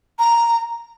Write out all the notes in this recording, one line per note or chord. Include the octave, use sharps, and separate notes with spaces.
A#5